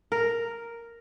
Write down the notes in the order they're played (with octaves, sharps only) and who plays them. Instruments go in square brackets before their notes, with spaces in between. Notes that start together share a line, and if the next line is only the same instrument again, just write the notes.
[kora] A#4